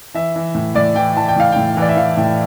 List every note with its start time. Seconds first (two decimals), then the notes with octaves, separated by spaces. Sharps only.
0.14 E3 E5
0.36 E3
0.55 A2
0.75 A2 D5
0.95 E3 G5
1.16 E3 A5
1.28 G5
1.36 A2 F5
1.52 A2 G5
1.77 E3 D5
1.89 E5
1.96 E3 F5
2.17 A2 G5